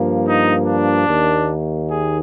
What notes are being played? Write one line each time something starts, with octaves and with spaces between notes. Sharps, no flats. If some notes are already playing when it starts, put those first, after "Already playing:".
Already playing: G2 F3 A#3
D#4
D4
D#2 D#3 A#3
G#4